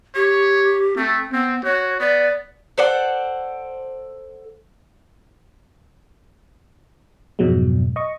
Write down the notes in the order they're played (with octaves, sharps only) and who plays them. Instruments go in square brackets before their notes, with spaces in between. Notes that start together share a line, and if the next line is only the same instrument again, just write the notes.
[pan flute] G4 [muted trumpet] C#5
[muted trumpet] A3 [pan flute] C4
[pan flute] B3 [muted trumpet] C4
[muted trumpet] F#4 [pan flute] C#5
[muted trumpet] B3 [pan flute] D5
[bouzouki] A4 C5 D5 F#5
[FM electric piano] F2 G#2 B2 F#3 G#3
D#5 C#6